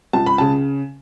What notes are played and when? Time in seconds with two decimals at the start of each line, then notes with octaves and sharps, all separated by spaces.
0.13 C#2 A5
0.26 B5
0.38 C#3 A5